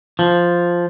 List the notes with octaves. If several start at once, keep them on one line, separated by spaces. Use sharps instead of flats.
F3